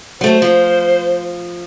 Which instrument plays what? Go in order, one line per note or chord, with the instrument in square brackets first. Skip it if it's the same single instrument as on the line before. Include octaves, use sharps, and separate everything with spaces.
[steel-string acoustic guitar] F#3 A3 [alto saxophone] C5
[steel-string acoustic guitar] F3